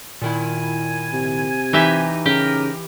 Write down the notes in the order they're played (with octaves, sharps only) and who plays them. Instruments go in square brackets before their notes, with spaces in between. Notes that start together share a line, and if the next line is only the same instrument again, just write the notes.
[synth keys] A#2 D#3 E4 [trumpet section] G#5
[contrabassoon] C3
[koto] E3 G4 E5 [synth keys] D#4 A#6 D#7
[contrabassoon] C#3 [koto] G4 [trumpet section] A#4